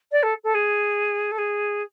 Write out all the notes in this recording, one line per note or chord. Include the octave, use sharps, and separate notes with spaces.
D5
A4
A4
G#4
A4
G#4